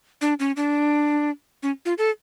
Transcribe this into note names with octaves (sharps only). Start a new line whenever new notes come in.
D4
C#4
D4
C#4
F4
A4